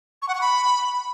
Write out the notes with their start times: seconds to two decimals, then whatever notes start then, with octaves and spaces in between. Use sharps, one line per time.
0.22 C#6
0.28 F#5
0.35 C#6
0.41 B5